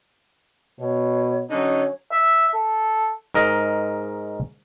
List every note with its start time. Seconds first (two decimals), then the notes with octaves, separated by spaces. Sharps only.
0.80 B2 C#5
1.50 D3 F#3 C#4 D#4 C#5
2.12 E5
2.55 A4
3.34 G#2 A#4 D#5